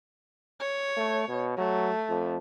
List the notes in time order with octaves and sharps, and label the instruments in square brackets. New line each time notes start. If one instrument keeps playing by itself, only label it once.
[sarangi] C#5
[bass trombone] A3
B2
[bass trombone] F#3 [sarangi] A3
[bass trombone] F2